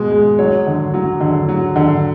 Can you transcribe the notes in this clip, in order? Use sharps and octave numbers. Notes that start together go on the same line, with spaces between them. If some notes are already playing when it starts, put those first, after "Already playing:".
Already playing: B2 G#3
G#3
F#3 C#5
D3
F#3
D3
F#3
D3